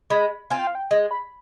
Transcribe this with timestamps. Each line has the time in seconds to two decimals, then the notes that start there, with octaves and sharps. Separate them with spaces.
0.10 G#3 B5
0.50 C4 F4 G#5
0.59 G5
0.67 F5
0.75 G5
0.91 G#3 D#5
1.11 B5